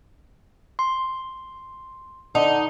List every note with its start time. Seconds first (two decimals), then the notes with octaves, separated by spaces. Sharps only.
0.79 C6
2.35 D3 D#4